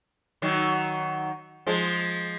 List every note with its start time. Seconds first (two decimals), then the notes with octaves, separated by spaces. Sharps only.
0.42 D#3 F#3
1.66 F3 G#3